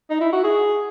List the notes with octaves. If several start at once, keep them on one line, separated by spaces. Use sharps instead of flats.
D#4
E4
F#4
G#4